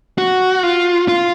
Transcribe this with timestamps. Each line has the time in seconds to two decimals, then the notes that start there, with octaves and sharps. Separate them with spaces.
0.18 F#4
0.63 F4
1.08 F4